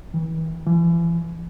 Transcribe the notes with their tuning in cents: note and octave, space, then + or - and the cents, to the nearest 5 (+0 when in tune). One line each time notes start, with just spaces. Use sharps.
E3 -35
E3 +40